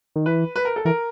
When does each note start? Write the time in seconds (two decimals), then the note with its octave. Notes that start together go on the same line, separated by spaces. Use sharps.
0.16 D#3
0.26 E3 B4
0.56 B4
0.65 A#4
0.76 A4
0.85 E3 A#4